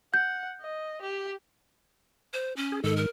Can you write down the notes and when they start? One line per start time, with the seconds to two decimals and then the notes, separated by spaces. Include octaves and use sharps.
0.14 F#5 G6
0.61 D#5
1.02 G4
2.33 C5
2.57 C#4
2.72 G#4
2.84 G#2 D#3 A4
2.97 A#4